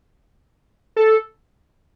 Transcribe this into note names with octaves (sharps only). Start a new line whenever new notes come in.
A4